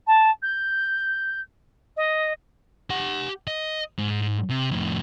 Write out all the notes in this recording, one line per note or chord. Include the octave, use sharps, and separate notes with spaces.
A5
G6
D#5
G4 F#5
D#5
G#2
C3
F2 A2